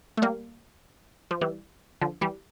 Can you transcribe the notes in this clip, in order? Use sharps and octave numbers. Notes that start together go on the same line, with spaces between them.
A3
G3 A#3
F3
E3 G3
D3 F3
E3 G3